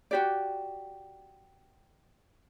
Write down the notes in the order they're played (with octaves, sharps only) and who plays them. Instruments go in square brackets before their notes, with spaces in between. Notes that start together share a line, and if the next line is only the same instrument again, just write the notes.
[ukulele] F#4 G4 D5